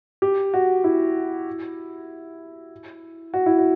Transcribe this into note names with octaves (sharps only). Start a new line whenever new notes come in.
G4
F#4
E4
F#4
E4
F#4